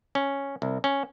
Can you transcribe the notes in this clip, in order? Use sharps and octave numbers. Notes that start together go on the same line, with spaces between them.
C#4
C2
C#4